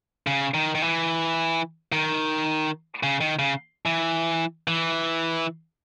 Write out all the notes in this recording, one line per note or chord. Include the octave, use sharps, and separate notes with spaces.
C#3
D#3
D#3
E3
D#3
C#3
D#3
C#3
E3
E3